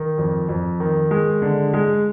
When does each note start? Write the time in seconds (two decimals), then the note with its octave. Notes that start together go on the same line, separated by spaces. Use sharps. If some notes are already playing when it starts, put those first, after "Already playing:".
Already playing: D#3
0.18 F2
0.49 F2
0.80 D#3
1.11 G#3
1.42 D3
1.73 G#3